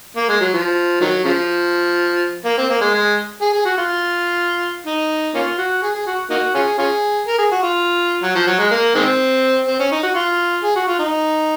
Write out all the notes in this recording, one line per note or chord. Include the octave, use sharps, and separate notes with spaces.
A#3
G#3
F#3
F3
D#3 F#3
C#3 F3
A#3
C4
A#3
G#3
G#3
G#4
G#4
F#4
F4
D#4
A#3 C#4 F4
F#4
G#4
G#4
F#4
A#3 D#4 F#4
C#4 F4 G#4
C#4 F4 G#4
A#4
G#4
F#4
F4
F#3
F3
F#3
G#3
A#3
D#3 G#3 C4
C4
C#4
D#4
F#4
F4
G#4
F#4
F4
D#4